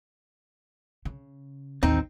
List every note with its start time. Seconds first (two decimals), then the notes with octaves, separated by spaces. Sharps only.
1.05 C#3
1.83 A1 D#2 C4 D#4